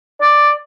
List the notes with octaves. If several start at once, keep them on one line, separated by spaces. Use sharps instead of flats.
D5